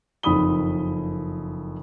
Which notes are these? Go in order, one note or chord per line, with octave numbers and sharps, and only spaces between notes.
F#1 F2 D#3 B5 D#6 G7